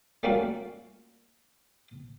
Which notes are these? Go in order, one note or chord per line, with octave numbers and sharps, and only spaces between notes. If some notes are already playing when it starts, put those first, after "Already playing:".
G3 A3 A#3 C#4 F4 F#4